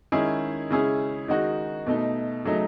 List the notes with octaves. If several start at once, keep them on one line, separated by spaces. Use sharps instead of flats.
D#3 G#3 C#4 E4 G#4
C#3 G#3 C#4 E4 G#4
D#3 G#3 D#4 F#4
B2 A3 D#4
C#3 F#3 A3 D#4